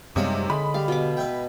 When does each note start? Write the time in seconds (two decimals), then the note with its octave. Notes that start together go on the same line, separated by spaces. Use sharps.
0.16 F#2 C3 G3 G#3 D#4 C#5 F5
0.50 D3 G#3 B5
0.74 G3 F5
0.88 B2 D6
1.17 B4 E5 G5